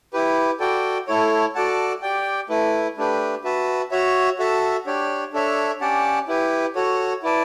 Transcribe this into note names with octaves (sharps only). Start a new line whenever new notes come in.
E4 G4 B4
F#4 A4 D5 G5
A3 E4 A4 C#5
F#4 A4 D5 F#5 A5
G4 D5 G5
A3 E4 B4
A3 D4 G4 B4
F#4 B4 E5 A5
F#4 C#5 E5
F#4 A4 E5 A5
D4 G4 C#5
D4 A4 C#5 E5
C#4 G4 D5 F#5 A5
E4 G4 B4
F#4 A4 C#5
E4 B4 D5 A5